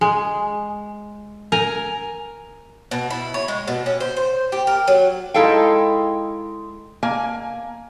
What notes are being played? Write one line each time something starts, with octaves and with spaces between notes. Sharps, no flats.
G#3
A#4 G#5 A#5
B2
E4
C#5
G#3
B2
C#4
C5
C5
G4
A#4
F#3
G#3 D#4 E4 A4 F5 G5
A#3 G#5